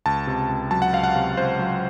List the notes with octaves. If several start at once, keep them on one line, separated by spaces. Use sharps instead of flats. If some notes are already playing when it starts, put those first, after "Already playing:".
C#2 A5
C3
C#2
F#3 A5
F#5
C#2 F5
F#5
C3
C#2 C5
F#3